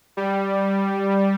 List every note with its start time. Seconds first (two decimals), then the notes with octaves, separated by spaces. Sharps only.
0.17 G3